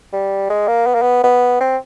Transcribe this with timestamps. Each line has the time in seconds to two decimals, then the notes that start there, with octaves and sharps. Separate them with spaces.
0.13 G3
0.50 G#3
0.68 A#3
0.86 B3
0.94 A#3
1.02 B3
1.24 B3
1.61 C4